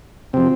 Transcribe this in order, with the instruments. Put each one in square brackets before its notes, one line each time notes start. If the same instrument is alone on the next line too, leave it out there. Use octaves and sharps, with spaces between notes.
[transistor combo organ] C3 F3 C4